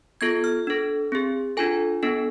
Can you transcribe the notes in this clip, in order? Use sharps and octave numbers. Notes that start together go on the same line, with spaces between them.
B3 F4 A4 G#6
F6
D4 A4
C4 G#4
D4 F4 A4 G#5
B3 D4 A4